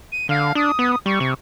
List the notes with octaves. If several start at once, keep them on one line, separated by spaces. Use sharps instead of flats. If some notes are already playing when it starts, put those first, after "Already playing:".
D#7
D3 F5
D4 D#6
B3
G3 C#6
C3